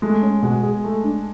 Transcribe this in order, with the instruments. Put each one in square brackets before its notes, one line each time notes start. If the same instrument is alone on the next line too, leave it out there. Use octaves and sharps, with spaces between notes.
[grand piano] G#3 [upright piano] A3
[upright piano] C#4
[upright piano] B2 [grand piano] G#3
[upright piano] G#4
A3
D4